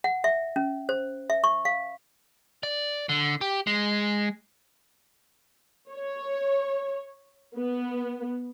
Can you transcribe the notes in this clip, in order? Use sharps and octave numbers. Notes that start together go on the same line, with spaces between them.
F#5
E5
C#4
C5
E5
C#6
F5
D5
D3
G4
G#3
C#5
B3